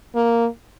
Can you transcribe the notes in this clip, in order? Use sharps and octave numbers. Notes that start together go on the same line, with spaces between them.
A#3